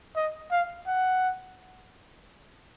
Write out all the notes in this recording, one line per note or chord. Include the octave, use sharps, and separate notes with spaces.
D#5
F5
F#5